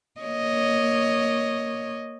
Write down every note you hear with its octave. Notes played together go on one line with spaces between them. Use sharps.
A#3 C#5 D#5